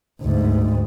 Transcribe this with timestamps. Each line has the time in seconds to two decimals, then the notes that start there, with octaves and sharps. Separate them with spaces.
0.22 D2 G#2